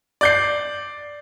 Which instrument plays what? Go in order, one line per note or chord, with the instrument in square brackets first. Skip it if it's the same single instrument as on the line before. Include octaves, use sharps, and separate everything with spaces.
[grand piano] D5 G6 C7